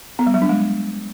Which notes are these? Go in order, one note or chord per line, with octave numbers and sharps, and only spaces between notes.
B3
G3
F#3
D4
G#3